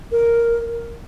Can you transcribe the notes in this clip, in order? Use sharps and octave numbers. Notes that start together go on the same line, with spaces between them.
A#4